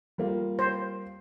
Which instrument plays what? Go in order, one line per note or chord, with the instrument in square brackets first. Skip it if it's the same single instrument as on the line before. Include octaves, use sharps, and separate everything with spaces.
[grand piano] G3 A#3 F4
[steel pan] C5